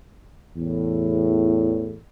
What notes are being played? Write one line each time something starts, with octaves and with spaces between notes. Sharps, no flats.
E2 A2